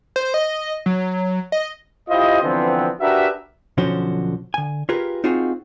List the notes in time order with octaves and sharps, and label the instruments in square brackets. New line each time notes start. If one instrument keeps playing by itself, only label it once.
[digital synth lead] C5
D#5
F#3
D#5
[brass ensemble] E4 F4 G4 C5 D#5
D3 E3 F3 B3 C4
D4 F#4 G4 A#4 B4 E5
[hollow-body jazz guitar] B1 D3 F3 C#4 F#4 C5
D3 G#5
F4 G4 G#4 A#4 B4
C4 D#4 F4 F#4 G#4